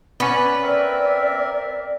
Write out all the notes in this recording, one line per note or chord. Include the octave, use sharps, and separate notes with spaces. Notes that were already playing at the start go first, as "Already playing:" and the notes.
B3 C#4 B4 D5
C4 A#4 D5 E5